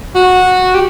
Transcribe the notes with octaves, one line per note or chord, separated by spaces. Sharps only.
F#4
G4